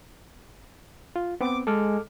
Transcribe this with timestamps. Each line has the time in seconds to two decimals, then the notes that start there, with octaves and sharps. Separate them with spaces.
1.16 F4
1.41 B3 C4 D6
1.67 G#3 A4 D6 F6